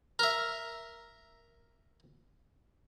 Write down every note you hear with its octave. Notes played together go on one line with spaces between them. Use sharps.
A#4 E5